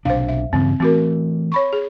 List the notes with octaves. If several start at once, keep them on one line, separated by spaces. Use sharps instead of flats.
B1 C3 D4 C5 F5
E5
G2 C#3 E3 C4
E3 A3 C4 F#4 A#4
C#5 B5 C#6
G#4